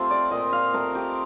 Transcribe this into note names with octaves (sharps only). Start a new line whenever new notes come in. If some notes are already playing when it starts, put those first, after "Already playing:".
Already playing: A3 C4 F4 G4 C5
D5
A#2 D#5
F5
A3 C4 A#4
G4